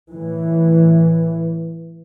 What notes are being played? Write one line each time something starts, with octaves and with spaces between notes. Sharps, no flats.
A2 E3